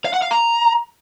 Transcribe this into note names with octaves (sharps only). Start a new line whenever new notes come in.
F5
F#5
F5
A#5